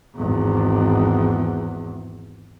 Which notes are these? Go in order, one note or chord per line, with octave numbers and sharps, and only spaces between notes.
G#1 E2